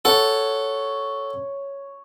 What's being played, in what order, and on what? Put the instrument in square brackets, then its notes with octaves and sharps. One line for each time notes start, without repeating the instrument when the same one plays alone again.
[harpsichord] A4 F#5 [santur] C#5